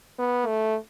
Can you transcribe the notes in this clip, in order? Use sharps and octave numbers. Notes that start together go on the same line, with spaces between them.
B3
A3